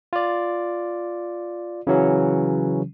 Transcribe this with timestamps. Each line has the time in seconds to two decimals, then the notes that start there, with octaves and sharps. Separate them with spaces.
0.13 F4 D5
1.87 C#3 E3 F#3 C#4